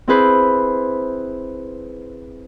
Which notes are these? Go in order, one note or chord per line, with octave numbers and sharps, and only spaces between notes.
C4 E4 G#4 B4 C5